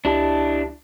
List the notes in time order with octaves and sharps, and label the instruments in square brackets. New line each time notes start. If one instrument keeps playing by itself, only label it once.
[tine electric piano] C#2 G4 A5 [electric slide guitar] D4 E4